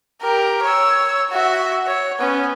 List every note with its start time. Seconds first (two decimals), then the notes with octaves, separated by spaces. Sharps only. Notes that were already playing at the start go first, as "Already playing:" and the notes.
0.21 G4 A#4
0.63 C#5 E6
1.31 F#4 E5
1.87 C#5
2.19 B3 C#4